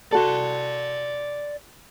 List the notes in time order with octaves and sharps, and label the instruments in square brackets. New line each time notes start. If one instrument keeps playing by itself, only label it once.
[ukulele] F#4 A4 [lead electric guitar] D5 C6